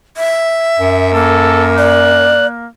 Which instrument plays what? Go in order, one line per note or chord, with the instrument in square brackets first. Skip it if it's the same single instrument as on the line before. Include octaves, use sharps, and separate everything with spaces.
[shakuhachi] E5
[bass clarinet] F#2
[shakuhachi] A#3 [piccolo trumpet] A4
[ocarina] D5 [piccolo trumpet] F#6